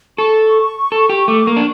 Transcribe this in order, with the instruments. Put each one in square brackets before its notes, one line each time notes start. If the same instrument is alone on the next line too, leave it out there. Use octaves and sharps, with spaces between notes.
[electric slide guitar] A4 [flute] C#6
[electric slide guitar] A4
G4
[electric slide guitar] A3 [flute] D6
[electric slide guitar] A#3 [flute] C#6
[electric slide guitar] D4